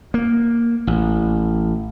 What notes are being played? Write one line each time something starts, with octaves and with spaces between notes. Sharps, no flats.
A#3
A1